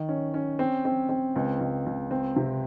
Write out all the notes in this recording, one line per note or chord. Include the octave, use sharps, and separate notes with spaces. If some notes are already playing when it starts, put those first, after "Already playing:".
Already playing: D#3
C#4
C#4
C4
C4
C4
C#2
C#2
C#2
C4
C3